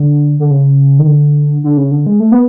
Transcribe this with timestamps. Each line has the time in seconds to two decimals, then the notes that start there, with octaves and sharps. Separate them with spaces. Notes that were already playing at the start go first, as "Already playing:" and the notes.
Already playing: D3
0.39 D3
0.51 C#3
0.99 D#3
1.07 D3
1.64 D3
1.77 C#3
1.91 D3
2.06 G#3
2.20 A3
2.32 B3